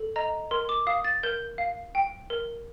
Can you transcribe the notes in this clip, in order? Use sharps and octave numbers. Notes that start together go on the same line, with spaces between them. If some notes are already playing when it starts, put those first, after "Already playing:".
Already playing: A4
D#5 A#5
A#4 C6
D6
F5 D#6
A6
A#4 G6
F5
G5
A#4